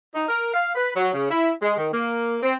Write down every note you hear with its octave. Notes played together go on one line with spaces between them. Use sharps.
D#4
A#4
F5
B4
F#3
C#3
E4
G#3
D#3
A#3
C4